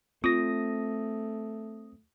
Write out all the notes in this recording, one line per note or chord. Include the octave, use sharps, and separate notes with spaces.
A3 C4 F4 D#6 A#6